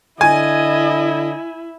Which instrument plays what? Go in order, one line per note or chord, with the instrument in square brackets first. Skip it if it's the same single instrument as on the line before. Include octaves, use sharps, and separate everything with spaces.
[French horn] D3 [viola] E4 [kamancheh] D#5 [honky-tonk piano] G#5